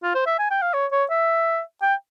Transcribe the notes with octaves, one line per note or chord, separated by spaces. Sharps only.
F4
C5
E5
G#5
G5
F5
C#5
C#5
E5
G5